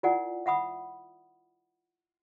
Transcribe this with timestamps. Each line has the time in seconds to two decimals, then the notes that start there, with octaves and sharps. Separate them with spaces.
0.03 E4 F4 A#4 D5 F#5 G#5
0.46 E5 F#5 B5 D#6